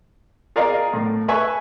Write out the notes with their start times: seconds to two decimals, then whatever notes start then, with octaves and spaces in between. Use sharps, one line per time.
0.56 G#4 A#4 D5 D#5 F5
0.94 A2
1.28 B4 E5 G#5 C#6